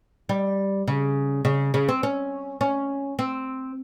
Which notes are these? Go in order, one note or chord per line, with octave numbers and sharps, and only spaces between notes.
G3
C#3
C#3
C#3
C4
C#4
C#4
C4